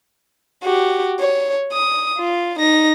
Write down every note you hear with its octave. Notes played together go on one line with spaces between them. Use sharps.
F#4 G4
C#5
D#6
F4
D#4 A#6